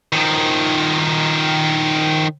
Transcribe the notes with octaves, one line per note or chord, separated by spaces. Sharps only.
D#3 F3